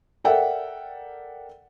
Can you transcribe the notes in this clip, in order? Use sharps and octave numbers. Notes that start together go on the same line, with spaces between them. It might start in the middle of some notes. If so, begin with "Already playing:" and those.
A4 A#4 D5 E5 F#5 G5